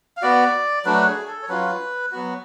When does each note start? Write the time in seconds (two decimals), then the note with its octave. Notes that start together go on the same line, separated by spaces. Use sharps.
0.17 F5
0.22 B3 F#4 D5
0.85 F#3 A3 D4 B4
1.06 G#4
1.27 A4
1.42 C#5
1.49 F#3 C#4 F4 B4
2.12 F#3 B3 F#4